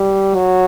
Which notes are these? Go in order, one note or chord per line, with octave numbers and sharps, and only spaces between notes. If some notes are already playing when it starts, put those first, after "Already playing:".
Already playing: G3
F#3